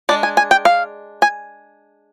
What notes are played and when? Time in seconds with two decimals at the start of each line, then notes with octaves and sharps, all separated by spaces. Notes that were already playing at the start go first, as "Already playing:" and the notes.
0.09 G#3 D4 D5
0.23 G#5
0.37 G#5
0.51 G5
0.65 F5
1.22 G#5